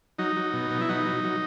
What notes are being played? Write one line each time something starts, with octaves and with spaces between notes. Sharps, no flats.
F#3 D#4
F#3
B2
B2
E4
F#3 D#4
F#3
F#3